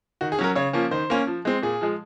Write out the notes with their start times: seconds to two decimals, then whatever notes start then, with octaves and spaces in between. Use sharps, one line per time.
0.21 D#3 F#4
0.32 G#4
0.39 F#3 C#4 A#4
0.56 C#3 C#5
0.73 F3 A#3 C#4
0.91 D#3 C5
1.10 A#3 C#4
1.27 F3
1.45 G#3 C4
1.62 A#2 G#4
1.81 F3 G#3